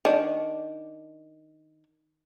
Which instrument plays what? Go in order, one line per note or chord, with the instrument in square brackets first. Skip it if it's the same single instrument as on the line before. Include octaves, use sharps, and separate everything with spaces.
[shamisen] D#3 D4